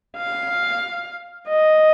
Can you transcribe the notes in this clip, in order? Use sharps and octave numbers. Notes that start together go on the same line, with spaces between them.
F5
D#5